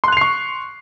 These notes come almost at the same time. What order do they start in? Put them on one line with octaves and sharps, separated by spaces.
C6 F#6 F7 C7 C#6